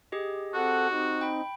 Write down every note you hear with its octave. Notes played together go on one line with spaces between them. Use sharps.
G4 G#4 D#5
C4 F#4 A4 F#5
C4 D#4
G5 B5